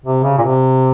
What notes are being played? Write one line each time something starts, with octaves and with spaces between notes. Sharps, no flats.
C3
C#3
A#2
C3